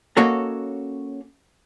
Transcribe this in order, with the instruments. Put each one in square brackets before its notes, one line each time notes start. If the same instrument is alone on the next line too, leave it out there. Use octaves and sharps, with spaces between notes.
[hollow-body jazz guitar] A#3 C#4 F#4 A4 C#5 D#5